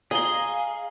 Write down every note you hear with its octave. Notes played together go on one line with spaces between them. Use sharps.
G#4 D#5 F5 A#5 C6